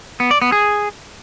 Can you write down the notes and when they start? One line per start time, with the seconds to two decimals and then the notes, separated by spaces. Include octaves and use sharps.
0.20 B3
0.31 D5
0.42 B3
0.52 G#4